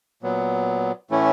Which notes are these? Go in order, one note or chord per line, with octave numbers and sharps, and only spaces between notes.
A#2 F#3 B3
A2 E3 A3 C#4 E4